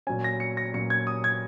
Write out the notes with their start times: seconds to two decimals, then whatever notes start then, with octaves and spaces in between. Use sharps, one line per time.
0.07 A#2 F#3 C#4 G#5
0.24 A#6
0.40 C#7
0.57 A#6
0.74 A#2 F#3 C#4 C#7
0.90 G#6
1.07 D#6
1.24 G#6